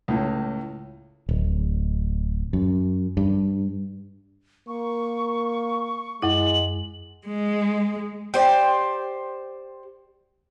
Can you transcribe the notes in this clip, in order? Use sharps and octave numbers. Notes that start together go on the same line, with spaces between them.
C#2 A2
D1
F#2
G2
A#3 C#6
F#2 G#3 E4 F#7
G#3
G4 C5 D5